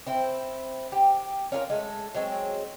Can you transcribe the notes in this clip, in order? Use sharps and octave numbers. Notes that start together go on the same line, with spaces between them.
C4 E4 C5
G4
C#4 F4 A4 A#4
G#3 A3
F#3 G#3 C4 C#5